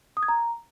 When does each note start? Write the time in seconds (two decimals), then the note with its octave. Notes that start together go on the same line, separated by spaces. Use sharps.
0.17 D#6
0.23 G#6
0.28 A#5